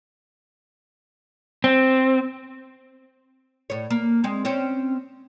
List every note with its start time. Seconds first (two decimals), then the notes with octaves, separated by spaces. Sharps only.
1.64 C4
3.70 A2 C#5
3.90 A#3
4.24 G#3 C4
4.45 C4 C#4 C#5